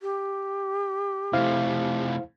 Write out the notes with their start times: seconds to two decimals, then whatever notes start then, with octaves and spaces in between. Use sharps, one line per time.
0.01 G4
1.33 C3 A3 E4 C5 F5